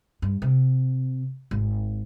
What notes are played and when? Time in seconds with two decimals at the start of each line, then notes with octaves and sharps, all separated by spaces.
0.22 G2
0.42 C3
1.51 G#1